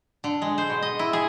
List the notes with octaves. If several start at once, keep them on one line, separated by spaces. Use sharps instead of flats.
D3
G#3
C5
B2
D#5
E4
G#4